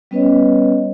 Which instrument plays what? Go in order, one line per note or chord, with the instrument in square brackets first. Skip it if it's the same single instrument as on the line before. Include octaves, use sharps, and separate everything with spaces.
[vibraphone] G3 B3 C#4 B4 C#5 D#5